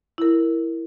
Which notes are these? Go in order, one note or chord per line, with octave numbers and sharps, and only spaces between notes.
E4 A#4